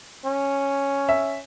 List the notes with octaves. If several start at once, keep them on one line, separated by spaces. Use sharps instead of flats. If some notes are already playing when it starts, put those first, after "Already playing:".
C#4
E5